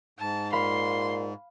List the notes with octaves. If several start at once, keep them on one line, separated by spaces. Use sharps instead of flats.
G#2 A5
A#2 F5 B5 C6